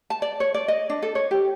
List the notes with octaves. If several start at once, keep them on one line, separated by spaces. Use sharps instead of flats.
A5
D5
C#5
D5
D#5
D4
A4
C#5
G4